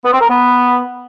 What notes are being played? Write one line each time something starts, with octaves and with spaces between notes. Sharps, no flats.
B3
C4
A#4
B3